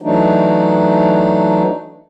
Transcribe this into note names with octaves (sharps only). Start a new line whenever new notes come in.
E3 F#3 A3 D4 D#4